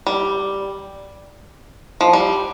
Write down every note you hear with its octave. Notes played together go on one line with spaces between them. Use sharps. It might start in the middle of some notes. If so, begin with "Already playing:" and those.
G3
F3
G3